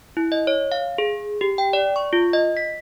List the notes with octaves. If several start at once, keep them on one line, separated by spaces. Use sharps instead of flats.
E4
D#5
C#5
F5
G#4
G4
G5
D5
C#6
F4
D#5
B6